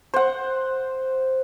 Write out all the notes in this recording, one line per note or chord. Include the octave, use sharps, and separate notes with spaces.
C5 F#5